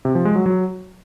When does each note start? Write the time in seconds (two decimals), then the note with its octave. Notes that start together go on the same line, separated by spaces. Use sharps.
0.05 C3
0.15 F3
0.25 G#3
0.36 F#3
0.46 F#3